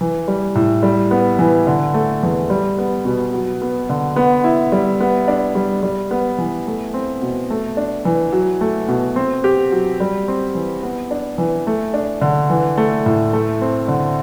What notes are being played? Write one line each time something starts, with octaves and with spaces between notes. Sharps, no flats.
E3
G3
A2
G3
B3
E3
D3
A3
E2
G3
B3
B2
F#3
B3
D3
B3
E4
G3
B3
D4
G3
G3
B3
E3
A3
C4
B2
A3
D4
E3
F#3
A3
B2
C4
G4
F#3
G3
C4
E3
B3
D4
E3
A3
D4
D3
E3
A3
A2
A3
C4
D3